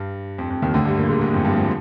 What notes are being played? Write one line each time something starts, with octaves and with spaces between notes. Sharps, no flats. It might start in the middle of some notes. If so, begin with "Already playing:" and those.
Already playing: G2
F2
F2
D#2 D#3
D2 D3
G2 G3
A#2 A#3
G#2 G#3
G#2 G#3
F2 F3
G2 G3
F3